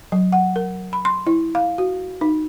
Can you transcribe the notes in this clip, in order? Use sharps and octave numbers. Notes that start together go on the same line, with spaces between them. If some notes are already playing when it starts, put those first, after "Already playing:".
F#3
F#5
A#4
B5
C6
E4
F5
F#4
D#4